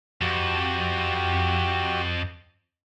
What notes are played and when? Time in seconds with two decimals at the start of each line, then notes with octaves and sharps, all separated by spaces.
0.21 F2 F#4 G4 G5